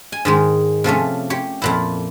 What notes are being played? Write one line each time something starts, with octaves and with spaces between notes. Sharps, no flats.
G#5
G#2 D#3 G#3
C3 F3 A3 C#4
G4 C#5
F2 A#2 E4